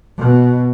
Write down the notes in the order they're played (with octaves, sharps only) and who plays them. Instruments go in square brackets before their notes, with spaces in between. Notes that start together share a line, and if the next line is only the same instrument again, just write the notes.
[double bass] B2